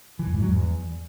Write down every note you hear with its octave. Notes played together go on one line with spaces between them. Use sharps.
E3
E2
G#2
F#3
E2